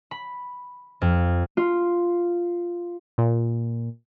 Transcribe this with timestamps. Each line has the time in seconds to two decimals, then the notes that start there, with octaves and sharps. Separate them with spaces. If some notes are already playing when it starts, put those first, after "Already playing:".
0.11 B5
1.01 F2
1.57 F4
3.18 A#2